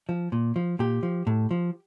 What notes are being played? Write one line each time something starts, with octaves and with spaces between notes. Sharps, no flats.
F3
A#2
F3
A#2 G4
F3
A2
F3